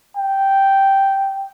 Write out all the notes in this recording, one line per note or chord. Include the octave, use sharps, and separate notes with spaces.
G5